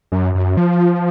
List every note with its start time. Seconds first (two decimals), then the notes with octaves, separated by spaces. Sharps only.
0.12 F#2
0.35 F#2
0.57 F3